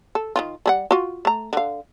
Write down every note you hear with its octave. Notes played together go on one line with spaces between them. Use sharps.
A4
D#3 E3 F4
G3 G#4 F#5
F4 F#4
A3 A#5
D3 F5